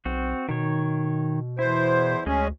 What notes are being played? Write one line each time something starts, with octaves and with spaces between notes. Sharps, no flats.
B1 C4 F#4
B2 D#3 C#5
E2 E4 C5
D2 G#3 C#4 G#4